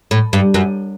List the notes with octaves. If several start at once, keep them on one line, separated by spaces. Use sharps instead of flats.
A2
G2
F#2